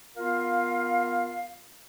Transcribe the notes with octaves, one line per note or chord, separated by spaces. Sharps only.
B3 F4 A#4 F5